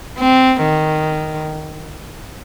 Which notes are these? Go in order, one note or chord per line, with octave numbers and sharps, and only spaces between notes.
C4
D#3